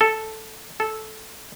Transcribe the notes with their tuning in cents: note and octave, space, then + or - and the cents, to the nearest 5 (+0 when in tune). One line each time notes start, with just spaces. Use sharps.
A4 +0
A4 -10